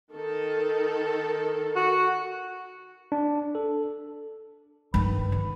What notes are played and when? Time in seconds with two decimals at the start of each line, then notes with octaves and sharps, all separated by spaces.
0.11 D#3 A4
1.76 F#4
3.12 D4
3.55 A4
4.94 G2 D#3 B4
5.32 C#3